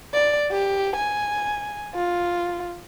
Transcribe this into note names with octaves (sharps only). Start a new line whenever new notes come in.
D5
G4
G#5
F4